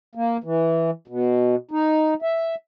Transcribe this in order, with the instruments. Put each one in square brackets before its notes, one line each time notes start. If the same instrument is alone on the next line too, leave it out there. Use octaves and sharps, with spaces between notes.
[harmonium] A#3
E3
B2
D#4
E5